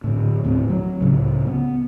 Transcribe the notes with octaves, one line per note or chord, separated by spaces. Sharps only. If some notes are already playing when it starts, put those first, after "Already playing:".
A2 D3
D#1 D2 A2 C4
F#3
C#2 A2 C#3
B3